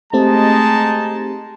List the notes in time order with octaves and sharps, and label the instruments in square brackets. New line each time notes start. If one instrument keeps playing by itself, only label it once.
[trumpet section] G#3 D#4 A5 [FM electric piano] A3 C4 G4